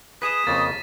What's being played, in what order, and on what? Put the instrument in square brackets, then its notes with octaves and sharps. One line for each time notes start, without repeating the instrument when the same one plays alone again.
[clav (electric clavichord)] G#4 B4 [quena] D#6 [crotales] B6 D#7 E7
[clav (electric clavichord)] F2 C#3 A#3 [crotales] A6